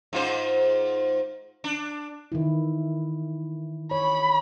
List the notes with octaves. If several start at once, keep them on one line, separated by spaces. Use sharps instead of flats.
G#2 F4 C5
D4
D#3 E3 E4
C#5 B5